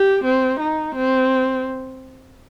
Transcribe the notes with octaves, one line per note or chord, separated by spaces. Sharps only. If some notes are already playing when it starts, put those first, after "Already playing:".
Already playing: G4
C4
D#4
C4